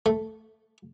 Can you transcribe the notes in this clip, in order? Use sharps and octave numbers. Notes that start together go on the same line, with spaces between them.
A3